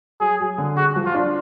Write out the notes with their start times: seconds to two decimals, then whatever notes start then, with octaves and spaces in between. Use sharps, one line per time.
0.20 F#3 G#4
0.40 F#3
0.58 D3
0.77 F#4 G#4
0.96 F3
1.06 F4
1.15 D4